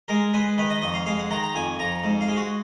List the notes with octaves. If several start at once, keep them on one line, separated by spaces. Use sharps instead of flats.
G#3 A#4
G#3 B4
D#3 B4
D#5
F2 D#5
F5
G#3 F5
F#5
D#3 A#5
A#5
F2 G#5
F2 A#5
G#2
F5
G#3
F#4